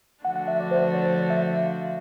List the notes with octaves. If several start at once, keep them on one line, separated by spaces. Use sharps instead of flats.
D3 F3 A3 D4 F#4 F#5
F#5
E5
D5
C5
D5
C#5
D5
D5
E5
E5
E5
F5